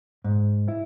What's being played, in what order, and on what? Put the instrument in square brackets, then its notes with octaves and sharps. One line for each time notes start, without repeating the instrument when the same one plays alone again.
[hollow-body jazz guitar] G#2
E4